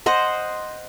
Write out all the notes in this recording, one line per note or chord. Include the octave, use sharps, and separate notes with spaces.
C5 D#5 F#5